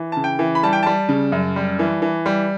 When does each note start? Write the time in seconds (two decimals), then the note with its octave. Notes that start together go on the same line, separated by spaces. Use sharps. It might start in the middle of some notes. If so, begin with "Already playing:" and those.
Already playing: E3
0.12 C#3 A5
0.24 G5
0.39 E3
0.55 B5
0.63 G3 A5
0.73 G5
0.83 G3 A5
1.09 C#3
1.32 F#2
1.56 G3
1.79 E3
2.02 E3
2.26 G3